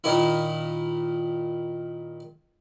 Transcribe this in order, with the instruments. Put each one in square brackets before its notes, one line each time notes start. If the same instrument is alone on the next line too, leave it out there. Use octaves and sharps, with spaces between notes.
[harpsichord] A#2 D#3 E4